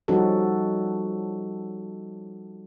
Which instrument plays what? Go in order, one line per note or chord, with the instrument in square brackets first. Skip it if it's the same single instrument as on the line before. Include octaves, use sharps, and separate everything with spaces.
[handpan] F3 G3 C#4 D#4 F#4 A4